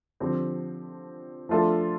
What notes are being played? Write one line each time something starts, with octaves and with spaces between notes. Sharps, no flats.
D3 F3 C4 G4
F3 A3 D4 F4 A4